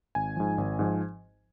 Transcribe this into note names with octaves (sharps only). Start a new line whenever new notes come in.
G#1 G#5
G#2 F3
G#1
G#2 F3